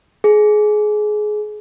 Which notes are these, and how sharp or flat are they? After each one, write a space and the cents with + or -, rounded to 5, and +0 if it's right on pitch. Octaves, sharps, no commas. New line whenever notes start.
G#4 +25